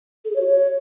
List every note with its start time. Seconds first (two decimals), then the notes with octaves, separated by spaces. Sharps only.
0.24 A4
0.30 G#4
0.35 C#5
0.41 F#4
0.46 C#5